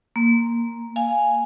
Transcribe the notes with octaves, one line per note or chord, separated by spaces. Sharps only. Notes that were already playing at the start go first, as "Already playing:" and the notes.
A#3
F5 G#5